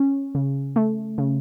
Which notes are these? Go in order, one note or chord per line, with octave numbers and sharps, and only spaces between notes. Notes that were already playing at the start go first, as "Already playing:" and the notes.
Already playing: C#4
C#3
A3
C#3